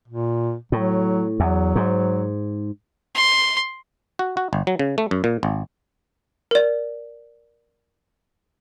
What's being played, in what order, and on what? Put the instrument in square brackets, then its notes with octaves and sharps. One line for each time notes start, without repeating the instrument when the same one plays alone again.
[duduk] A#2
[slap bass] A2 [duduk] F#3
[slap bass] E2 [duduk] F#3
[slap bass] G#2
[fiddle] C6
[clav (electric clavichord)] F#4
F#4
G1
F#3
C#3
A3
F#2
A#2
G#1
[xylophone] A#4 D5